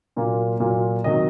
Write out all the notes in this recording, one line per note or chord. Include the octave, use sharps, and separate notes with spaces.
A#2 F#3 A#3 F4
A#2 F#3 A#3 F4
C3 D#3 F#3 D#5